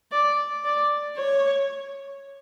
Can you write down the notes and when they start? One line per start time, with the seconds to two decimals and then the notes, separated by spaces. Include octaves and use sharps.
0.12 D5
0.64 D5
1.17 C#5